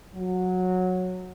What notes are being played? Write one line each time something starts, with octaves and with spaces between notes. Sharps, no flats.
F#3